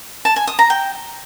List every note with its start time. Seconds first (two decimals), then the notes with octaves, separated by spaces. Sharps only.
0.25 A5
0.36 G#5
0.47 D#6
0.59 A#5
0.70 G5